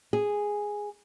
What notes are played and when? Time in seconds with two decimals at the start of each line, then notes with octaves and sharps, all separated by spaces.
0.13 G#4